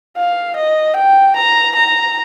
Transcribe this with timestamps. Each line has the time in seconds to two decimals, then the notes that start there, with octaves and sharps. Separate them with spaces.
0.17 F5
0.57 D#5
0.97 G5
1.37 A#5
1.76 A#5